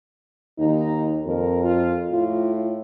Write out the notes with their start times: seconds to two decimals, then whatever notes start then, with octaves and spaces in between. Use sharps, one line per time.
0.58 D#2 D#4
1.26 F2 A#4
1.64 F4
2.12 A2 F4